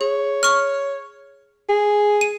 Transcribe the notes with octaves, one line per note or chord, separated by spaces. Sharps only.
G#4 C#5
C#6 F6
G#4
D#7